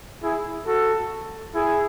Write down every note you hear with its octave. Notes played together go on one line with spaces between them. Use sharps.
E4 G#4
F#4 A4
E4 G#4